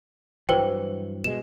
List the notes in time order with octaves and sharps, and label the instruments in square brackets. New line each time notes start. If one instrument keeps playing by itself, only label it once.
[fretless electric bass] G2 E3 F#3 [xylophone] B4 C5 G5
[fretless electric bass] B2 G#3 [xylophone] E7